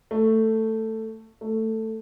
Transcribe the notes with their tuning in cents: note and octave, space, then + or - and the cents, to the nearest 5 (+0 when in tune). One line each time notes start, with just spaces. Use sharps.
A3 +10
A3 +10